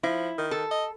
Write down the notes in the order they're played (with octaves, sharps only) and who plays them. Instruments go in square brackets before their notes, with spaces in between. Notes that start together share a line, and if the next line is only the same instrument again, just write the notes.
[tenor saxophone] F3 [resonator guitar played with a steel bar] E4
[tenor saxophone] D#3
[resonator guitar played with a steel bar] A4
[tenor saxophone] D#5